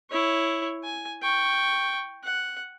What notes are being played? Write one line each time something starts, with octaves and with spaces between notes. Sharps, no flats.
E4 C#5
G#5
G5 C#6
F#5